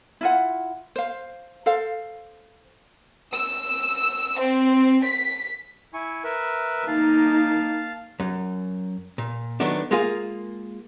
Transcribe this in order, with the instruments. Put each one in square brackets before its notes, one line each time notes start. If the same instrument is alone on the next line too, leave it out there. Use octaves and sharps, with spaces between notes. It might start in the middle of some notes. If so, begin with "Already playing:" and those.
[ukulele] E4 F4 F#5
C5 F5
A4 C5 F5
[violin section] E6
C4
B6
[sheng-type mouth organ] E4 G#5 C#6
A#4 B4 E5
[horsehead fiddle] A#3 D#4 [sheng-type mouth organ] F5 A5
[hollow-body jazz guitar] F#2
A#2
D#3 F#3 A3 B3 D4
G#3 A#3 F4 G#4 F5